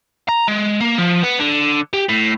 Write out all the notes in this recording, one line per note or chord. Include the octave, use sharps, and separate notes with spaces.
A#5
G#3
A#3
F3
B3
D3
G4
A2